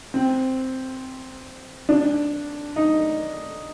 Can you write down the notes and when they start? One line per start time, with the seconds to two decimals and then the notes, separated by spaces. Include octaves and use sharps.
0.14 C4
1.89 D4
2.76 D#4